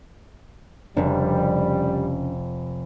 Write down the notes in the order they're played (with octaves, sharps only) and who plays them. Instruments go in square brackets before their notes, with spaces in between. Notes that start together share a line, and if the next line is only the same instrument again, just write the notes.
[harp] F1 [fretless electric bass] C#3 C#4 D4 [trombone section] G3